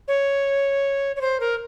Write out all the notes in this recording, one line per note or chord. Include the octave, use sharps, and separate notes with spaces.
C#5
C#5
C5
A#4